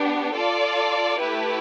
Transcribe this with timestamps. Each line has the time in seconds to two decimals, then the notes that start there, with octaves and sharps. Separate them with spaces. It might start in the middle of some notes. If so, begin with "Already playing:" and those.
Already playing: B3 D4 G4
0.33 F4 A4 D5
1.19 A3 E4 G4 B4